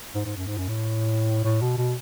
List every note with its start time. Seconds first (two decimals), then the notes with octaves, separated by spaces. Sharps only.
0.15 G#2
0.25 G#2
0.36 F#2
0.47 G#2
0.58 F#2
0.68 A2
1.44 A2
1.62 B2
1.78 B2